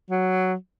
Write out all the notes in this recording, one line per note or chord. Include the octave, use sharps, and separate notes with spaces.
F#3